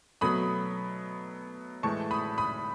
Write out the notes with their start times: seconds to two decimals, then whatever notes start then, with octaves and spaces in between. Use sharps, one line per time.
0.21 B2 F#3 A3 B5 D#6
1.83 A2 E3 G#3 A5 C#6
2.11 B5 D#6
2.38 B5 D#6